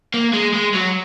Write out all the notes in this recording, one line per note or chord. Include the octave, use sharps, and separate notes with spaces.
A#3
G#3
G#3
F#3